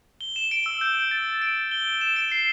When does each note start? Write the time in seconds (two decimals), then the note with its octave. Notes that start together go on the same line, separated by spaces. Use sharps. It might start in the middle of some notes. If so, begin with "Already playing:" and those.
0.21 G7
0.36 E7
0.51 D7
0.66 E6
0.81 G6
1.11 A6
1.42 D7
1.71 G7
2.01 E7
2.16 D7
2.31 C7